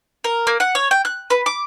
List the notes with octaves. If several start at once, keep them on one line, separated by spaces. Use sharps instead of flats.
A#4
A#3
F#5
C#5
G5
F#6
B4
D6